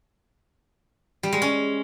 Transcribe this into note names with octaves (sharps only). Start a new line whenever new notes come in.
G3
G#3
C#4